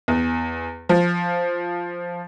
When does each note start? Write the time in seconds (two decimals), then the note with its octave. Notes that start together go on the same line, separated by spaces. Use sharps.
0.08 E2
0.89 F3